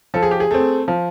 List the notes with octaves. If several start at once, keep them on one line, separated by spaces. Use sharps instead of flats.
F3 A4
G#4
G4
G#4
A3 C4
F3